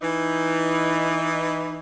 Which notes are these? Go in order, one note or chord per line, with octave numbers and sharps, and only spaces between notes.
E3 D#4